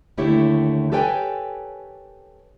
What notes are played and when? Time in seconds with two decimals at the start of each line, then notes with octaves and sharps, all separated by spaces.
0.17 D#2 D3 A3 E4 G4 C#5
0.92 G4 A4 B4 C#5 G5 G#5